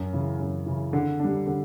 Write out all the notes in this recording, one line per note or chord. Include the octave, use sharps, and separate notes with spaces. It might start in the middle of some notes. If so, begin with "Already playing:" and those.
Already playing: F#2
C#3 E3
F#2
C#3 E3
D3
G3 D4
D3